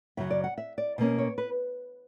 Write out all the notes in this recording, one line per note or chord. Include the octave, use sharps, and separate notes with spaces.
F#2 C#3 F#3 E5
D5
F#5
E5
D5
B2 A#3 C#4
C#5
B4